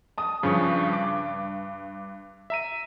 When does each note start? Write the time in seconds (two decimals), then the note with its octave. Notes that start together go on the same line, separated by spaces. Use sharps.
0.18 A5 D#6
0.43 G2 C#3 F3 C#6
0.93 D6
2.50 E5 A#5 D#7